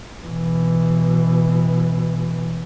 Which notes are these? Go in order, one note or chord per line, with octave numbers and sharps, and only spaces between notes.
B2 E3